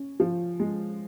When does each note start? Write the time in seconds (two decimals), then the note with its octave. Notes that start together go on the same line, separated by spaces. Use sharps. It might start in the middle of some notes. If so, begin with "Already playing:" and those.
Already playing: C#4
0.20 F3
0.60 G#3